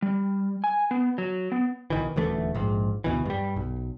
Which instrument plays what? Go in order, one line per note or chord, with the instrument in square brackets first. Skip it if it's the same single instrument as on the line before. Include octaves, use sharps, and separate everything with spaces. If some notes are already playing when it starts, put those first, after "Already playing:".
[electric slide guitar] G3
G#5
B3
F#3
B3
[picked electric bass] B1 D#3 E3
D#1 D2 E3 A3
A#1 G#2
D2 B2 E3
G2 G3
B1